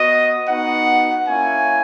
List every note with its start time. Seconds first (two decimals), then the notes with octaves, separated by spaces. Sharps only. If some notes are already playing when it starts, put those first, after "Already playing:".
Already playing: B3 F#4 D#5
0.48 B3 D#4 F#4 F#5
1.27 A#3 C#4 E4 G#5